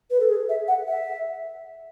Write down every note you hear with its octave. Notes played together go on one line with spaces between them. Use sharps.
B4
A4
G#4
E5
F#5
E5